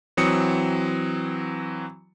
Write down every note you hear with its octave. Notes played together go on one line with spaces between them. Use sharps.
E3 F#3 C4 D#6 C#7